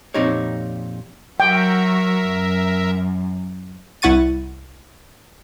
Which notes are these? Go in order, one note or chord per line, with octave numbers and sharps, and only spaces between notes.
F2 A#2 C4 D#4 G4 C#5
F#3 F#4 A#4 E5 G5
F#2
C2 E4 F#5 C#6 A6 D#7